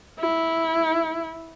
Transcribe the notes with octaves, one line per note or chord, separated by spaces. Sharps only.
E4